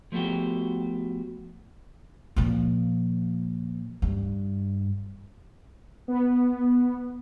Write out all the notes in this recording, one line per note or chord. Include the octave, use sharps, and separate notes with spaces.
F3 A3 B3 F#4 G4
A#2 F3
G2
B3